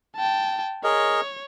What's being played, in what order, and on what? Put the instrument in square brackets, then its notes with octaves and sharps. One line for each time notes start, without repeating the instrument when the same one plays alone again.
[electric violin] G5 A5
[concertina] G#4 A#4 D#5 [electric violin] C#5